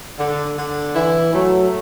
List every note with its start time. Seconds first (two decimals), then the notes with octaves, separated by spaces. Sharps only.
0.19 D3
0.57 D3
0.96 E3 E4
1.34 F#3 A3